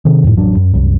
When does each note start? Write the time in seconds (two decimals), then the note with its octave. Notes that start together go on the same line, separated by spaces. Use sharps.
0.05 C3 D#3
0.24 F2 A2
0.37 A1 F2 F#3 D4
0.57 F#2
0.74 C2 F#2